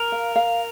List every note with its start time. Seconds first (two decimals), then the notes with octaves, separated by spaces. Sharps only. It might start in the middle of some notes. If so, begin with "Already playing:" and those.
Already playing: A#4
0.12 F5
0.36 F5